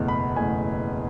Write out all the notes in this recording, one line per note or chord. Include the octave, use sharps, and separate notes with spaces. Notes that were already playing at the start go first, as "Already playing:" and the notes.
Already playing: F#1 E2 B2 A3
B5
F#1 E2 B2 A3 G#5